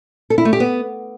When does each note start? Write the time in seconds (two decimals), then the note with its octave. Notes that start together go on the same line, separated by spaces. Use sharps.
0.30 A4
0.38 E4
0.45 A3
0.53 G4
0.60 B3